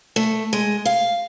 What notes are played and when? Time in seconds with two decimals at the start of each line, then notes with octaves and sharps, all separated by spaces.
0.16 A3
0.53 G#3
0.85 F5